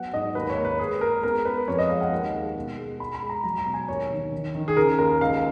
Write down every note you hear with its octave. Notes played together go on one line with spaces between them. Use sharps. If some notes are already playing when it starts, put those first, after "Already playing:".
Already playing: F#3 B3 F#5
G#2 D#5
D#2 B4
C#5
A#3
B4
G#3 G#4
G#3 A#4
B3 A#4
B3 B4
F2 C#5
D#5
G#3 F5
F#5
D#2
G#3
B2
G#3
G#3 B5
B5
G#3
A#5
F#3 A#5
A#5
B2
G#5
D#2 C#5
D#3
D#3
D#3
G#4
C#3 A#4
D#2 A#4
C#2 F5